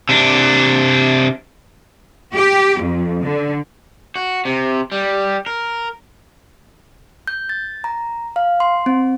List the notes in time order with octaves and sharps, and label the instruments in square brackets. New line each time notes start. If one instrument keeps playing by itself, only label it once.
[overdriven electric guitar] C3 D4
[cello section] G4
F2
D3
[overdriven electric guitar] F#4
C3
G3
A#4
[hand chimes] G6
A6
A#5
F5
C6
C4